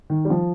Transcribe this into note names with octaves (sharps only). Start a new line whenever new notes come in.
D#3
G3
F3